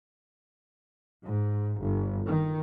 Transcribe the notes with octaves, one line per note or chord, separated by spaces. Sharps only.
G#2
G1
D#3